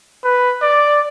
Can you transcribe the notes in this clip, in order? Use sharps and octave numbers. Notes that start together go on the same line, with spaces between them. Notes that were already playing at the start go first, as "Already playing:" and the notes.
B4
D5